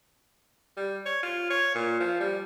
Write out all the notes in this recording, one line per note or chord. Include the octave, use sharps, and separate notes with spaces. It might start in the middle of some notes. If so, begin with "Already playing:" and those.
G3
C#5
F4
C#5
A#2
F3
G3